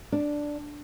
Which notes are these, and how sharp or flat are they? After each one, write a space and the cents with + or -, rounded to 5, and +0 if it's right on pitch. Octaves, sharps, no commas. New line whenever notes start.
D4 +0